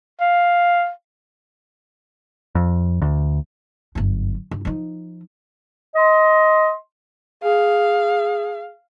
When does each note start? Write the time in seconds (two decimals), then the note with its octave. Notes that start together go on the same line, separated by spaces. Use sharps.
0.21 F5
2.55 F2
3.02 D2
3.95 G1 F#2
4.51 G2
4.65 F3 D#4
5.96 D#5 C6
7.43 G#4 F5